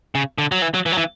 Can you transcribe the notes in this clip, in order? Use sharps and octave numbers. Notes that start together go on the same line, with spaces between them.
C#3
D3
F#3
E3
F#3
E3
F#3
E3